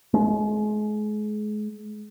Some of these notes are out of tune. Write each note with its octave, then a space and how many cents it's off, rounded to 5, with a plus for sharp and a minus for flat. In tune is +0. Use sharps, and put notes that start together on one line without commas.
G#3 +30